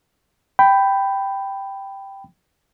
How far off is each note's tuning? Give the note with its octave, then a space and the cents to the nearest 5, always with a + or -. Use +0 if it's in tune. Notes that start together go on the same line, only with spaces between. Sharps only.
G5 +0 B5 +10